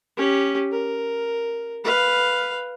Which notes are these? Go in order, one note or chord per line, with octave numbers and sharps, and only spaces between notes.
C#4 G4
A#4
B4 F5